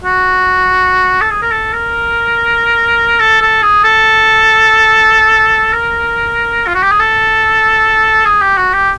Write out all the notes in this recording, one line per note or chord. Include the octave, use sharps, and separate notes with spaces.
F#4
A4
G#4
A#4
A4
A#4
A4
A4
G#4
A4
A#4
F4
F#4
G4
G#4
A4
G#4
G4
F#4
G4